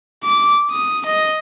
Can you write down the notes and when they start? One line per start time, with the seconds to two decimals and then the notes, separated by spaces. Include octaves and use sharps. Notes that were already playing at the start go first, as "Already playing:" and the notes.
0.24 D6
0.71 D#6
1.06 D#5